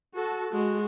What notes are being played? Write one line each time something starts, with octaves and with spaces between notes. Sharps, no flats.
F#4 A4
G#3 F#4